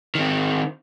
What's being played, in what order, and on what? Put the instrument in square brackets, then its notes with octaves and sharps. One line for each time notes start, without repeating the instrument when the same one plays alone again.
[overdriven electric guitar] D#3 C4